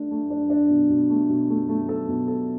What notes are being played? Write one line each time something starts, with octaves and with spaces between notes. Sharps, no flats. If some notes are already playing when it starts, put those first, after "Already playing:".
Already playing: A3 D4
A3
D4
D4
B2
B2
A3
B2
A3
A3
A4
B2
A4